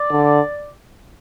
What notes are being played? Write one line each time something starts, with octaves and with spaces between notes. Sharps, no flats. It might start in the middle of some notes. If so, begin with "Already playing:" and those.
Already playing: D5
D3